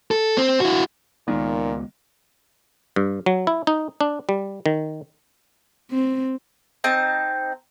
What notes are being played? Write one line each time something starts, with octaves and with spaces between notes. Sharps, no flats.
A4
C4
E4 F#4
C#2 A#2 D#3 G#3 B3
G2
F#3
E4
D#4
D4
G3
D#3
C4
C4 D#4 A5